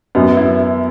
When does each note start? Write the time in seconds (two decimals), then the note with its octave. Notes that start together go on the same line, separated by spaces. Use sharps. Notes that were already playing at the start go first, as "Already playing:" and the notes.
0.15 F#2 B3
0.37 E4